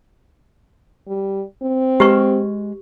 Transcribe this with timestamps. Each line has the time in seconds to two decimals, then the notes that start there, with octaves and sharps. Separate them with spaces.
1.07 G3
1.62 C4
2.00 G#3 G4 B4 C#6